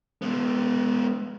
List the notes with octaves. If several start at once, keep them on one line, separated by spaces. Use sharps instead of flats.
G#3 B3